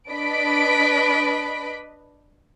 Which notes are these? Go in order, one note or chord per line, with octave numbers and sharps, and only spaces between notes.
D4 B4 D#5 B5 B6 D7